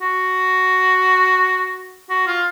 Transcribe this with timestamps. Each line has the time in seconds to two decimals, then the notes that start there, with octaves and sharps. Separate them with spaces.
0.02 F#4
2.10 F#4
2.27 F4